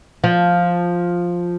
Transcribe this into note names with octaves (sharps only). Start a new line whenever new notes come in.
F3